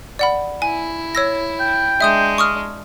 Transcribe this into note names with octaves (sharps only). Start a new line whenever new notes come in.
D5 F#5 B5
E4 G#5
C#5 E6 A#6
G5
G#3 D4 E5 D#6 G6
C#6 D#6 F6